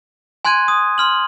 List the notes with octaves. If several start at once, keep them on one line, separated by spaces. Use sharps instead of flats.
G#5 C6 F#6 G#6 D#7
D#6
C6 F6 F#7